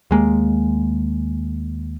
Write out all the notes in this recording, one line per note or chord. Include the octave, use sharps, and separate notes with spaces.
D#2 G#3 A#3